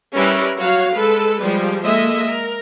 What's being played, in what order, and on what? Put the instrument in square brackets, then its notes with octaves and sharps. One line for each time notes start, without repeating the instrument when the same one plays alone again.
[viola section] G3 C#4 E4 A#4 B4 E5
F#3 F#4 C#5 F5
G#3 A4 B4
F3 G3 G#3
G#3 A#3 A4 D#5 E5
A#4